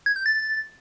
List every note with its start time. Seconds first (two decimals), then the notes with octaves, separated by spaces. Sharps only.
0.06 G#6
0.16 G6
0.26 A6